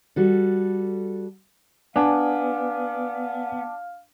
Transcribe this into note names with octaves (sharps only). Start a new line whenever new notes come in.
G3 F#4 A4
B3 D4 D5 F5 G#5